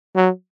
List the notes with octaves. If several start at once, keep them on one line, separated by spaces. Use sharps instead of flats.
F#3